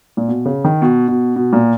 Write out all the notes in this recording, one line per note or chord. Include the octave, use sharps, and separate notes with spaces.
A#2
B2
C#3
D#3
B2
B2
B2
A#2